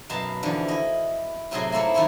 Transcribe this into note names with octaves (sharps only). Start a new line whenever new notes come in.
F#2 B2 F5 A5
E2 D3 F3
E4 D#5
A2 C3 F#3 E4 G#4 C6
A#3 C4 E4 A4
F#2 D#3 E4 F4 C#5